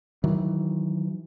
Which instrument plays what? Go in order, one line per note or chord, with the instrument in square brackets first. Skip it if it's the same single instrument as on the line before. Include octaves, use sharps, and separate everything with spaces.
[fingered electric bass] D#3 E3 F#3